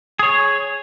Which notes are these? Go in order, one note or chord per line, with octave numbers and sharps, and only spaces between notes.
G#4 C#5